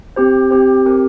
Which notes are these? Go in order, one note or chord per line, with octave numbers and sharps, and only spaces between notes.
C4 G4 C5
C4 G4 C5
C4 G4 A#4